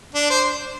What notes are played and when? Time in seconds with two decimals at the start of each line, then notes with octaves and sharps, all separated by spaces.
0.14 D4
0.30 C5